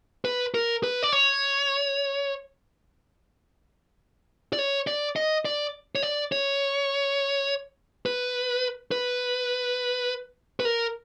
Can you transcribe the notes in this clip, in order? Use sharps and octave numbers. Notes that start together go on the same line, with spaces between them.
B4
A#4
B4
D5
C#5
D5
C#5
D5
D#5
D5
C#5
D5
C#5
B4
B4
B4
A#4